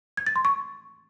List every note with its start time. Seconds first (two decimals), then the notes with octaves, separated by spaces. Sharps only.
0.17 G#6
0.27 A6
0.36 C6
0.45 C#6